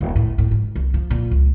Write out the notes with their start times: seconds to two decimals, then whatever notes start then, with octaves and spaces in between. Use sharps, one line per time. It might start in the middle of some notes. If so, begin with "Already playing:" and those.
0.01 D#1
0.16 A2
0.38 A2
0.51 G#2
0.76 C2
0.94 F3
1.10 A#2
1.31 C#2